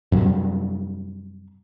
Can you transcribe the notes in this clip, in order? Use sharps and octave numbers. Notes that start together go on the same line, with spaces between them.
F#2 C3 F#3 G3